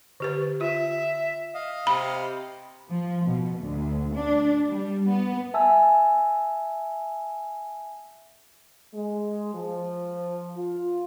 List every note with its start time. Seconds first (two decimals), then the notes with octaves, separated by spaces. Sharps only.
0.20 D3 G4 B4
0.61 F4 E5
1.54 D#5 F5
1.87 C3 B5
2.90 F3
3.25 B2
3.61 D2
4.14 D4
4.68 G3
5.08 B3
5.54 E5 G#5 A5 E6
8.94 G#3
9.54 F3
10.57 F4